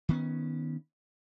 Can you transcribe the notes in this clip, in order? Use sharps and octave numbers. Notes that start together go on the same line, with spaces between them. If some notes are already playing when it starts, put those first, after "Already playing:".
D#3 B3 C#4